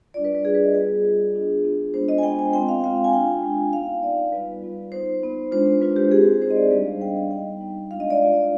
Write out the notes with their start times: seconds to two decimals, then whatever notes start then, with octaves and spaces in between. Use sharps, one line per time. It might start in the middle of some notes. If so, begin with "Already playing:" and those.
0.14 G3 D4 F4 D5
0.24 B4
0.35 B4
0.44 G3 D4 F4 G#4
0.55 B4
0.64 D#5
0.74 G3 B3 F4 G#4
1.04 G3 B3 F4
1.34 B3 D4 F4
1.64 B3 D4 F4
1.94 G#3 B3 D4 F4 C5
2.09 D#5
2.18 G#5
2.23 G#3 B3 D4 F4 G5
2.39 G#5
2.53 G#3 C4 F4 G5
2.68 F5
2.83 G#3 C4 F4 F5
3.04 G#5
3.13 G#3 D4 F4 G5
3.43 G#3 D4 F4
3.73 B3 D#4 F5
4.03 B3 D#4 D5
4.32 G3 B3 F4 B4
4.62 G3 B3 F4
4.92 B3 D#4 C5
5.22 B3 D#4
5.52 G#3 D4 F4 C5
5.81 G#3 D4 F4 B4
5.96 G4
6.11 G#3 C4 D#4 G#4
6.41 G#3 C4 D#4 C5
6.50 D#5
6.56 D5
6.71 G3 B3 D4 D#5
6.86 F5
7.01 G3 B3 D4 G5
7.16 G5
7.31 G3 B3 D#4 G5
7.61 G3 B3 D#4
7.91 G#3 D4 F4 F5
8.00 D#5
8.10 D5
8.20 G#3 D4 F4